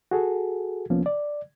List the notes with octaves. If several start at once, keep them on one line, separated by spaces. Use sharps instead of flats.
F#4 G#4 A4
C2 F3 A#3 B3 C#4
D5